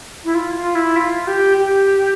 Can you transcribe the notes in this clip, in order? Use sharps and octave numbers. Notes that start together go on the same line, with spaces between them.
E4
F4
F4
E4
F4
G4
G4